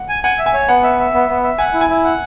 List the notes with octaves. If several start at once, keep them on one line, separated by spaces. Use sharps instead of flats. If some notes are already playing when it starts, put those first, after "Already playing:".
Already playing: F#5
G#5
F#5 G#5
E5
G#5
C#5
B3 F#5
E5
E5
B3
B3
E5
F#5 G#5
E4
G#5
E4
F#5